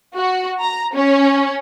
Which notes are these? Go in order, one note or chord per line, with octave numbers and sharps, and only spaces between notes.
F#4
A#5
C#4